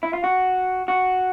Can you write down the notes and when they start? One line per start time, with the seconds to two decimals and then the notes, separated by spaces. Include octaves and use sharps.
0.03 E4
0.13 F4
0.24 F#4
0.88 F#4